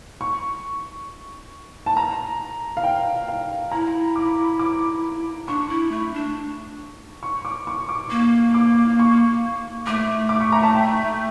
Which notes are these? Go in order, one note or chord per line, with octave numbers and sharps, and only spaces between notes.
C#6
A5
A#5
F5
G5
F5
E4 A#5
D6
D6
D4 C#6
E4
A3
D4
C#6
D6
C#6
D6
A#3
D6
C#6
A3 D6
D6
C#6
A#5
A5
G5